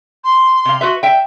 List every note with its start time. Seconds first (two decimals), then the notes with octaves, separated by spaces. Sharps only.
0.24 C6
0.65 C3 F5
0.81 F#4 B4 E5
1.03 E5 G5